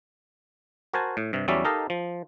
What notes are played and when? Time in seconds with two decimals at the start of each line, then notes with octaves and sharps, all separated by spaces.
0.94 F#4 A#4 C5 G#5 A5
1.17 A2
1.33 G2 C3
1.48 E2 F#3 G3 C#4 D5 E5
1.65 D#4 G4 A4 A#4 D#5 F5
1.90 F3